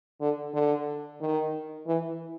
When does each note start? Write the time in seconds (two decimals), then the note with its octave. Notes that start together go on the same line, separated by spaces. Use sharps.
0.20 D3
0.53 D3
1.21 D#3
1.86 E3